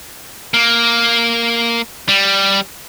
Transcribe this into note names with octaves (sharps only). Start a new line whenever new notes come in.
A#3
G3